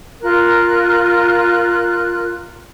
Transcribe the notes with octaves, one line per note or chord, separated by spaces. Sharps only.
F4 A#4 F#6